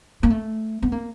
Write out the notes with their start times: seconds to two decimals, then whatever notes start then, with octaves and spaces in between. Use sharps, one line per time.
0.23 A#3
0.30 A3
0.82 B3
0.92 A#3